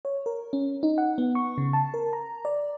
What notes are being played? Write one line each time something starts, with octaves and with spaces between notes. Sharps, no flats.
C#5
A#4
C#4
D#4
F#5
B3
C#6
C#3
A5
A#4
A#5
D5